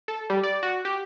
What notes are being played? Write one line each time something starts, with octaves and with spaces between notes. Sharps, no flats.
A4
G3
D5
F#4
G4